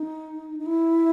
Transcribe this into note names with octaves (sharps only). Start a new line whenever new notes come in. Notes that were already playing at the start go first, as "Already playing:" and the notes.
Already playing: D#4
D#4
E4